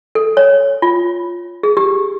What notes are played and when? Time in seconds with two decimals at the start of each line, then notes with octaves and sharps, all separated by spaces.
0.15 A4
0.37 C#5
0.82 F4
1.63 G#4
1.77 G4